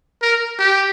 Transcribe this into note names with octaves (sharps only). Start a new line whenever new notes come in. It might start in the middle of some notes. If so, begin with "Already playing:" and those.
A#4
G4